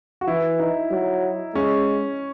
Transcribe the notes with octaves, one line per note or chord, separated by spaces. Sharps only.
F#4
E3 E4
D#4
F#3
G#3 C#4